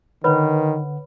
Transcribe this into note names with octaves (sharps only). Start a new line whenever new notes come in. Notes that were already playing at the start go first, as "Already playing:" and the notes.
D3 D#3 B4 C#5 F#5 B5